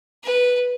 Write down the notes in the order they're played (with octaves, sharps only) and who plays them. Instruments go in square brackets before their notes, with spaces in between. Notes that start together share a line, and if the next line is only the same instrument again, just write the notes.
[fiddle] B4